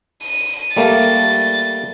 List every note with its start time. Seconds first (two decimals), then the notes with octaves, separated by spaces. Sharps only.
0.23 D#7
0.77 G3 A3 A#3 A6